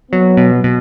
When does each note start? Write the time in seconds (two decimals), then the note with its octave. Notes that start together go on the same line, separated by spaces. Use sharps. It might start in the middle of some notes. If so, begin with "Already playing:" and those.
0.11 F#3 B3
0.37 B2
0.64 B2